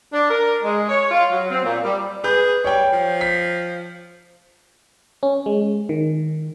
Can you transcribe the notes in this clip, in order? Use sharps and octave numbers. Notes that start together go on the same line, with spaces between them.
D4
A#4
G#3
C#5
F4
F#3
C4
A#2
G3
G#4 B4 G6
G3 C#5 G5
F3
B6
C#4
G#3
D#3